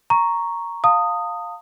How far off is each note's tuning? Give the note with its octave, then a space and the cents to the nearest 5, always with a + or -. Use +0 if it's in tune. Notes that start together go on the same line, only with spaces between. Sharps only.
A#5 +0 C#6 +0
F5 +10 A5 +45 D#6 +0